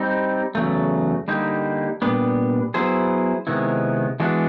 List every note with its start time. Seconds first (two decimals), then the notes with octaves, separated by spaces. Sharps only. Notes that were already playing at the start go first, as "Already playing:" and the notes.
Already playing: G3 C4 D#4
0.55 E2 C#3 F#3 A3
1.28 D3 G3 A#3 D#4 G4
2.02 A#2 G3 B3 D4
2.74 F#3 B3 E4 G#4 C5
3.47 C3 D#3 G#3 B3 E4
4.20 E3 G#3 B3 D4 F#4